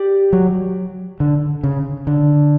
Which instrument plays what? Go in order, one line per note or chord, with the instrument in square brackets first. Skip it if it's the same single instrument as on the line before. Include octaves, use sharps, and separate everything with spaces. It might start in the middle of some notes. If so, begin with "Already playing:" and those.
Already playing: [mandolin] G4 D5
[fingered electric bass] F#3
D3
C#3
D3